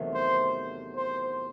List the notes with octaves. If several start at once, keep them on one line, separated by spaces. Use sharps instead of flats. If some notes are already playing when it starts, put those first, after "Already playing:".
Already playing: E2 C3 D#3 F#3 A3
C5
C5